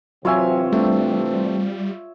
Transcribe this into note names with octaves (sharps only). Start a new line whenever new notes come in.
C3 E3 F#3 C4 F4 C#5 E5 G#5
G3 A3 D4